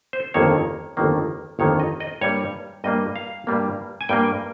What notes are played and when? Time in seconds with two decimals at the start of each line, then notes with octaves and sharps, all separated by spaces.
0.13 C5
0.34 G1 F2 D#3 A#3 C#5
0.97 G1 F2 D#3 A#3
1.59 G1 F2 D#3 A#3 C#5
1.80 D#5
2.00 D#5
2.21 G2 G3 A#3 C#5
2.84 G2 G3 A#3 D#5
3.16 F5
3.47 G2 G3 A#3
4.01 G#5
4.09 G2 G3 A#3 G5